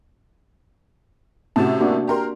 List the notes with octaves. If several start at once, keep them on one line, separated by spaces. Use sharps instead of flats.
A2 C3 C#4 F#4 A5
A#3 D4 F#4
G4 A#4 C6